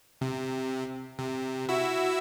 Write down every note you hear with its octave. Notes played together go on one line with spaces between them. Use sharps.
C3
C3
E4 F#4 E6